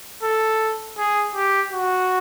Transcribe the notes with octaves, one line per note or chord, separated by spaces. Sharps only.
A4
G#4
G4
F#4